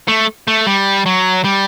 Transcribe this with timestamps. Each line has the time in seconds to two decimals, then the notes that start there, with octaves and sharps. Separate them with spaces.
0.08 A3
0.48 A3
0.67 G3
1.06 F#3
1.45 G3